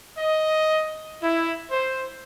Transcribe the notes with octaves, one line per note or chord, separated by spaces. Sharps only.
D#5
E4
C5